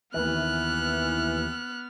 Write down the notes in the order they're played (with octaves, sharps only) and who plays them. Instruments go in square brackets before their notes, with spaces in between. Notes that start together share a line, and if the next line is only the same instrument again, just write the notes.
[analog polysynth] D#2 E3 [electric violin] B3 F6 [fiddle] F#6